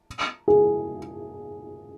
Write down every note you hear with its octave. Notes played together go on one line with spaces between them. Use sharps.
G#4